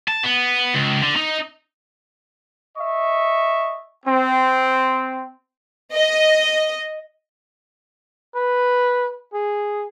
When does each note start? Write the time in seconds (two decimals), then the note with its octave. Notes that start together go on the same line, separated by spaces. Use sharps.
0.08 A5
0.24 B3
0.74 C#2
1.02 D3
1.16 D#4
2.77 D#5 E5 C#6
4.06 C4
5.94 D#5
8.35 B4
9.33 G#4